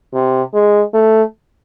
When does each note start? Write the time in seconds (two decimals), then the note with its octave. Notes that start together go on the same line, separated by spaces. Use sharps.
0.14 C3
0.54 G#3
0.94 A3